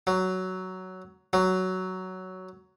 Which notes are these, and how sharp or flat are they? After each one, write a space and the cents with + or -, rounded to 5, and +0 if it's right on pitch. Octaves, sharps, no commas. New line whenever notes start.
F#3 +10
F#3 +10